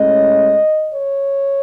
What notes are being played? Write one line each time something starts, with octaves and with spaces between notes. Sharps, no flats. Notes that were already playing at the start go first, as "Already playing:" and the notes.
Already playing: A2 G#3 C#4 D#5
C#5